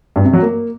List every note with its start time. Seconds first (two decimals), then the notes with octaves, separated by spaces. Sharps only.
0.16 G2
0.25 C3
0.33 F#3
0.42 A#3